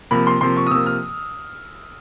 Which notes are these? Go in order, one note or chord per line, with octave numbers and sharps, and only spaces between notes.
C3 F3 A#3 B5
C6
C3 F3 A#3 C6
C#6
D#6
C3 F3 A#3 E6
F6